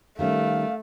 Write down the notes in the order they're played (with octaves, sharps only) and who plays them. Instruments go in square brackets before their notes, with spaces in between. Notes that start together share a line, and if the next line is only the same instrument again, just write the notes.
[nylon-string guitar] D#3 G3 C#4 [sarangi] A3 [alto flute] F5